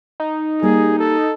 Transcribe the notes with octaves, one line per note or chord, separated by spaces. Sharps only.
D#4
G3 A#3 G4 G#4
A4